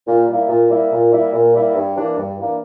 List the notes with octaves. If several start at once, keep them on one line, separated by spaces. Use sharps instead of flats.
A#2
G3 A#3 E4
A#2
G3 A#3 E4
A#2
G3 A#3 E4
A#2
G3 A#3 E4
G2
E3 A#3 D4
G2
E3 A#3 D4